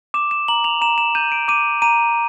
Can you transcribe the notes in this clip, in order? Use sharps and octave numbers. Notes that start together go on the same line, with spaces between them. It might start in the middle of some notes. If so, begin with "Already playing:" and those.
D6 E7
E7
A#5 F#7
F7
A#5 E7
E7
G6 D#7
D7
D6 D#7
A#5 D#7